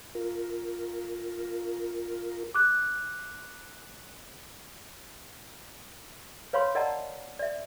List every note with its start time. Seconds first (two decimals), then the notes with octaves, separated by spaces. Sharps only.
0.15 F4 A#4
2.55 D6 F#6
6.53 B4 C#5 F5 B5 C6
6.75 A#4 D5 D#5 F#5 A5 A#5
7.39 D5 E5